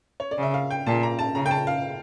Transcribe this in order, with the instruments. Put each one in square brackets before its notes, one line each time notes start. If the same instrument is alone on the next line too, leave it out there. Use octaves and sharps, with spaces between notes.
[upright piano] C#5
D5
[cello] C#3
[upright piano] E5
F5
G5
[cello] A#2 [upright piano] A5
[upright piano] A#5
A5
[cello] C#3 [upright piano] A#5
[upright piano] G5
A5
F5